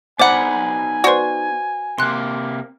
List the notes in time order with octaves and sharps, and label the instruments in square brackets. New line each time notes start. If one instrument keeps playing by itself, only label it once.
[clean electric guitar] B3 D#4 B5 [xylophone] C5 [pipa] D5 F#5 [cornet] G#5
[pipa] F#4 C5 [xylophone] B4 D5
[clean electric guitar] C3 A#3 [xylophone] C6 F#6